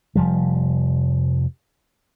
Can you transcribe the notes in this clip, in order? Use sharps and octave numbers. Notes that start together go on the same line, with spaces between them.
F1 F3 G3